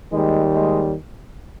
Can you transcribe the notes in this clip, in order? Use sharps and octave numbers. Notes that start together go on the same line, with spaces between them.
D#2 D#3 G3 G#3
G#3